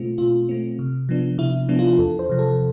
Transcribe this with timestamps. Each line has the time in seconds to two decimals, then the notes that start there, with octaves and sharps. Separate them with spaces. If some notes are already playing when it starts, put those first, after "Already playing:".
Already playing: B2 A3 C4 F4
0.18 B2 F4
0.49 A3 C4
0.79 C3
1.09 F3 B3 D4
1.38 C3 E4
1.69 F3 B3 D4
1.79 F4
1.99 E2 A4
2.19 C5
2.29 C3 F3
2.39 A4